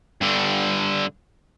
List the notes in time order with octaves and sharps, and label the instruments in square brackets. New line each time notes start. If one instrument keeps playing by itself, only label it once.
[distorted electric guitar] G2 D3